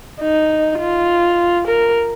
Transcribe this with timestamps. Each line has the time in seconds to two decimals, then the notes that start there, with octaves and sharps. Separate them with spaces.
0.21 D#4
0.79 F4
1.67 A#4